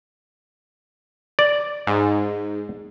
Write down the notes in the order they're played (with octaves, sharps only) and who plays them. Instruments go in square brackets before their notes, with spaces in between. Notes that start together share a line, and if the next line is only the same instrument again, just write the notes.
[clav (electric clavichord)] D5
[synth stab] G#2